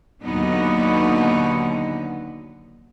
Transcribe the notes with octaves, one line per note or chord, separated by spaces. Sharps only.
D#2 B2 D3 F#3 B3 D#4